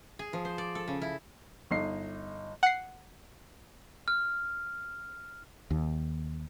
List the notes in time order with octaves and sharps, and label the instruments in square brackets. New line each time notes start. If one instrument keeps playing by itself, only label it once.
[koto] G#4
F3
C5
D5
A4
C#3
E4
[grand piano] G1 D#4 C7
[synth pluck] F#5 C7
[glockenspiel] F6
[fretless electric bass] D#2